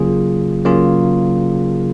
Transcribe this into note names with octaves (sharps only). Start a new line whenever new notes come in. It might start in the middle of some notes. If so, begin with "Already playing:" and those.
Already playing: C#3 F#3 A#3 F4 G#4
C#3 F#3 A#3 F4 G#4